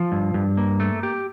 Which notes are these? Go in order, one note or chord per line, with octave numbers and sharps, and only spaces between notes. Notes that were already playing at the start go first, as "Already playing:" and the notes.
Already playing: F3
G2
G2
A#3
A3
G4